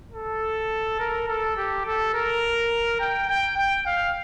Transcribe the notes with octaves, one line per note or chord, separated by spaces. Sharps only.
A4
A#4
A4
G4
A4
A#4
G5
G5
G5
F5